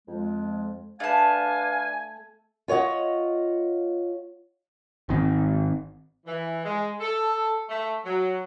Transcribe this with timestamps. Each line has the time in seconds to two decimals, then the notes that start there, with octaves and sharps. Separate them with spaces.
0.08 F2 G#3
1.00 A3 D4 B4 F5 G#5 A5
2.68 F4 C#5 D#5 F#5
5.09 G#1 D#3 C4
6.25 E3
6.64 G#3
7.00 A4
7.69 A3
8.04 F#3